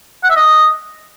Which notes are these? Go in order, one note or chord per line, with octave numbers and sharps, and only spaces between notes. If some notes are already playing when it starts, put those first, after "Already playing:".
F#5
E5
D#5